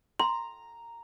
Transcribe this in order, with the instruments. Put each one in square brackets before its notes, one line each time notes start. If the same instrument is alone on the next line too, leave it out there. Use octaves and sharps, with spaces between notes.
[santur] A#5 [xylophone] C6